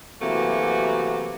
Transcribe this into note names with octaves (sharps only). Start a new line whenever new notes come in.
C3 E3 F#3 A3 A#3 F#4